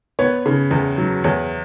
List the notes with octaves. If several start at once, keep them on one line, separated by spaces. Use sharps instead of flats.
B3 C#5
C#3
E2
F#3
E2 C#5